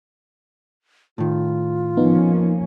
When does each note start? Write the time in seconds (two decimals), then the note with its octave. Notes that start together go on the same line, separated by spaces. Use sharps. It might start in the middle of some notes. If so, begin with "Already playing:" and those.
1.18 A2 D#3 F4
1.97 F3 A#3 B3 C#4 D#4